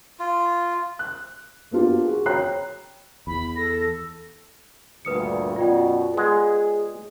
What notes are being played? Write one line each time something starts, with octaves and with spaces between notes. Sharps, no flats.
F4
F#6
A#3 B3 D4 F4 G4
F#4 G#4
C#5 G5 A#5 B5 F#6 C7
E2 B5
A4 A#6
D2 G2 A#2 B4 D#6 C#7
F#2 B2 F4 D5 G5
G#3 B3 G#4